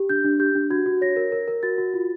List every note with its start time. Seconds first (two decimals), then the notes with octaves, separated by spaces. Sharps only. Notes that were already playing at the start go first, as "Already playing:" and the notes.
Already playing: G4
0.09 D4 G6
0.24 D4
0.40 G4 G6
0.55 D4
0.71 F#4 G#6
0.86 F#4
1.02 C#5 A#6
1.16 A#4
1.32 A#4
1.48 A#4
1.63 F#4 A6
1.78 F#4
1.94 F4